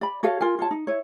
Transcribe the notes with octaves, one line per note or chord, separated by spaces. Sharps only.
D5 B5
F#4 A4 C#5 F5
F4 A#4 G#5
F4 C#5 A5
D#4
E4 C#5